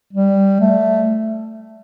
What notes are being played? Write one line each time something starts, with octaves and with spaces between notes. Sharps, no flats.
G3
A3